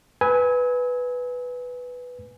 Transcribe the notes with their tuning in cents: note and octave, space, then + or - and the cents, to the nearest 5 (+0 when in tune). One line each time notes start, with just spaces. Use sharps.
B4 +0 G#5 +0 E6 -40